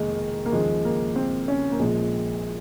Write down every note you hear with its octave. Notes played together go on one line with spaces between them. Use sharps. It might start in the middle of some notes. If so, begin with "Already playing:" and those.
Already playing: F1 F2 D#3 G#3 A#3
A#3
D#2 C#3 F3 G#3
A#3
C4
C#4
A#3
A#1 A#2 F3 G#3